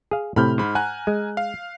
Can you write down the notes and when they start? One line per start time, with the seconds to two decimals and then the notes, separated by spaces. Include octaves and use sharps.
0.11 G#4 F5
0.36 A2 C3 B5 F6 G6
0.58 G#2 B5
0.75 F#5 G#5 A#5 F#6
1.07 G#3
1.37 F5